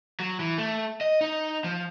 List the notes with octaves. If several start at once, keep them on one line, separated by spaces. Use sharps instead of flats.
F#3
E3
A3
D#5
D#4
F3